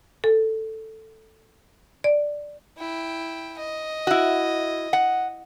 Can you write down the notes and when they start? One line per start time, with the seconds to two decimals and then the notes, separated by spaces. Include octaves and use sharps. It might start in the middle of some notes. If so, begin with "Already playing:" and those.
0.24 A4
2.04 D5
2.78 E4 G5
3.58 D#5
4.07 E4 F#4
4.93 F#5